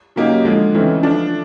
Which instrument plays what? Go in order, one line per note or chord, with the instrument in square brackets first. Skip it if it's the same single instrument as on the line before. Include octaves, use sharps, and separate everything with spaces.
[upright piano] C#3 F#3 A#3 D#4 G4
D3 F3 G#3
C#3 E3 A3 C4 D#4
F3 A3 D4